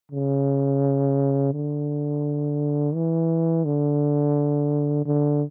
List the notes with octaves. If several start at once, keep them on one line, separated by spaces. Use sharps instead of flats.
C#3
D3
E3
D3
D3